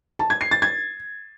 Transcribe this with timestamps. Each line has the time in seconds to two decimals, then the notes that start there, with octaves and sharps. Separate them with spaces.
0.19 A5
0.30 G#6
0.41 C7
0.51 A6
0.62 G#6